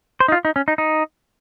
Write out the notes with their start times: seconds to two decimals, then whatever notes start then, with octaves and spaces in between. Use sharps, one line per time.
0.20 C5
0.28 D#4
0.32 F4
0.45 D#4
0.56 C#4
0.68 D#4
0.78 D#4